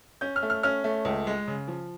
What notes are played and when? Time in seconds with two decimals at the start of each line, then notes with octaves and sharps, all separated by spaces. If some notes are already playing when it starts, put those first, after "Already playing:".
0.21 C#4 G6
0.36 F6
0.43 A3
0.50 F6
0.63 C#4 F6
0.84 A3
1.05 C#2
1.27 G#3
1.48 C#3
1.68 F3